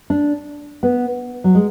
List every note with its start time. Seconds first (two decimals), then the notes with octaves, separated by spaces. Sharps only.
0.10 D4
0.83 B3
1.44 F#3
1.55 G#3